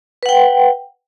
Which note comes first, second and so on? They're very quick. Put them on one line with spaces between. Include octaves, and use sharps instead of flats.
B4 F#5 G5